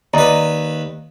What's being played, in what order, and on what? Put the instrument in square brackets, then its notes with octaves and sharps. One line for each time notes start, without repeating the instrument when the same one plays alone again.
[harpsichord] D#2 B4 [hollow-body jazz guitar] D5 D#5 A#5